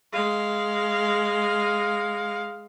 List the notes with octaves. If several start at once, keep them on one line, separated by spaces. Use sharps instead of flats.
G#3 F5